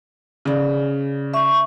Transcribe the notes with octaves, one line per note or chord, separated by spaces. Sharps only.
C#3 D5
E5 C#6